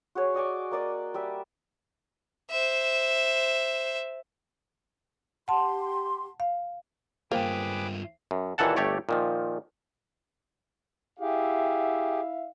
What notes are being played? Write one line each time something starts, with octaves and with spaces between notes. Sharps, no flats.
F#4 G#4 C#5
D5 D#5 G#5 D6
A#3 D5 D#5
G3 E5
C5 E5
G4 F#5 A5 C6
F5
G2 A#3 F4 G#4 B4 C5 G5 D6
F#2
D#2 A#2 E3 A4 F#5 A5
G1 A3 G4 C#5 D5
A#2 D#3 F3
E4 G4 G#4 E5 F5